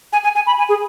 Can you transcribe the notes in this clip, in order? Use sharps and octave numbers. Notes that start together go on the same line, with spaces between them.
G#5
G#5
G#5
B5
G#5
G#4